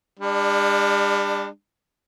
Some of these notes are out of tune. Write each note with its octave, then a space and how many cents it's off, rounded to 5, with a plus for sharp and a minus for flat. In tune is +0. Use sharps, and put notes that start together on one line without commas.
G3 +45 D4 +15